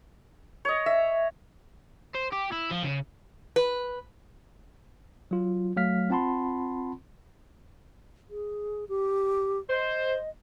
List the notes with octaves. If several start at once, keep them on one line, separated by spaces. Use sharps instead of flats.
C#5 D#5
E5
C5
G4
E4
F3
C#3
B4
F#3 F4
F#3 A3 F5 F6 B6
C4 F4 F#5 A5 B5 C6
G#4
G4
C5 D#5